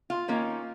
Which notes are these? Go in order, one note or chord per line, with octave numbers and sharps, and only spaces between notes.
F4
D#3 A#3 C#4